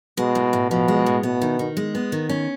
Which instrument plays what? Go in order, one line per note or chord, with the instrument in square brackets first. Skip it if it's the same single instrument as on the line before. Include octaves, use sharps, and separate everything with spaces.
[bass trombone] B2 [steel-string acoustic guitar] G#3
[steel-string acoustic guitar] A2
A2
[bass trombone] B2 [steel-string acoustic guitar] F3
[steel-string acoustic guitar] G#3
A2
[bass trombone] B2 [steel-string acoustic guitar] B3
[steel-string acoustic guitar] D#3
D#3
G#3
B3
D#3
C#4